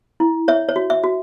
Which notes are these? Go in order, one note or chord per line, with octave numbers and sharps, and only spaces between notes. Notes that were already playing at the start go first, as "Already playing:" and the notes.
E4
C#5 E5
C#5
F#4
E5
F#4